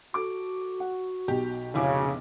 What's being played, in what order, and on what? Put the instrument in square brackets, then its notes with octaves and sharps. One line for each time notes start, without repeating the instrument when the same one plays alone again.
[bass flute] F#4 [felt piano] A4 D6
[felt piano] F#5
[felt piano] B1 B2 [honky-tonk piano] G4
[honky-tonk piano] F1 E4 D6 [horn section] C#3